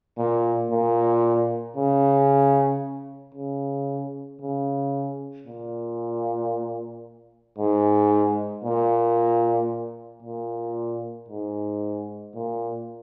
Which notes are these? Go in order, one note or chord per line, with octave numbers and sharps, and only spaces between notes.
A#2
A#2
C#3
C#3
C#3
A#2
G#2
A#2
A#2
G#2
A#2